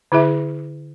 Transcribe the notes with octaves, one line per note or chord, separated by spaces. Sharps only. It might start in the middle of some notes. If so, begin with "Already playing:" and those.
D3 E4 G#4 E5